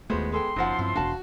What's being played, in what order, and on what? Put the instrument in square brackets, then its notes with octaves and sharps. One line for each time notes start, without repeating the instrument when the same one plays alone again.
[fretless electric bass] D#2 A3 [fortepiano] G#3 B3 [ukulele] F4 F#4 C5
[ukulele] G#4 A4 G5 [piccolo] C6
[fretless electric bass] F#1 [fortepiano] F#2 F3 [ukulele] D#4 F#5
[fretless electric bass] G2 C4 [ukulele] E4
[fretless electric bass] E1 D4 [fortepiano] F#4 [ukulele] F5 A5